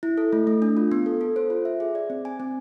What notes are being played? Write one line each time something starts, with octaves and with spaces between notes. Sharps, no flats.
E4
A4
A3
A3
D4
F4
B3
A4
A4
C5
F4
E5
G#4
D5
C4
G#5
C4